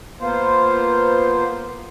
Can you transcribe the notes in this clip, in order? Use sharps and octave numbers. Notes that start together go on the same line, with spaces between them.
A#3 B3 F4 C5